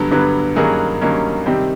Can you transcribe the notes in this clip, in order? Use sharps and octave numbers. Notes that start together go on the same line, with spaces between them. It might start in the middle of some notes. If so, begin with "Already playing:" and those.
Already playing: G2 D3 F#3 B3 A4
G2 D3 F#3 B3
G2 D#3 F#3 A#3 C#4 G#4
G2 D#3 F#3 A#3 C#4
C3 D#3 G3 C4